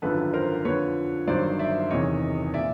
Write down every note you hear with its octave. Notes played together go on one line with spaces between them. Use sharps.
G#1 F#2 D3 F3 A4 B4
A#4 C5
F2 D3 F3 B4 C#5
G1 G2 D#3 F#3 C5 D5
D5 E5
E1 E2 C3 D#3 C#5 D#5
A#2 F3 D5 E5